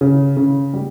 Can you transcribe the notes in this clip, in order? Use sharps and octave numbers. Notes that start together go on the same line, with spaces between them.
C#3
C#3
G3